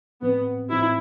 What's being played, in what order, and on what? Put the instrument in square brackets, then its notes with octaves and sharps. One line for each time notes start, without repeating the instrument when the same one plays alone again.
[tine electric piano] A1 A2 F3 C4 [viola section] B3
[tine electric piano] A1 A2 F3 C4 [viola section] E4